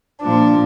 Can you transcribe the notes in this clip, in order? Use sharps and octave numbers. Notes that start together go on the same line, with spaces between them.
A#2 F3 D4